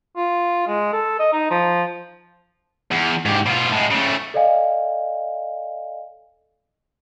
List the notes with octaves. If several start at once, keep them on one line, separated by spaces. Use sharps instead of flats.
F4
G#3
A4
D#5
D#4
F3
E2
G#2 G4
B2 F4
A2 G#3
C#3 A3
A4 D5 D#5 F5 G#5